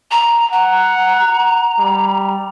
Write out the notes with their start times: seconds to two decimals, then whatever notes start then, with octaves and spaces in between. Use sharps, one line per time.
0.11 A#5
0.52 F#5 A#5
1.79 G3